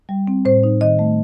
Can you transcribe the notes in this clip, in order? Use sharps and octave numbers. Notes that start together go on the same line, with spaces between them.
G3
C4
A2 C5
D#4
D#3 D#5
A3